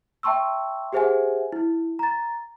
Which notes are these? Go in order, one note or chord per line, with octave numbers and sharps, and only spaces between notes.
E5 G5 A5 C6 C#6 E6
G4 G#4 C5 E5 F#5 G#5
E4
A#5 A6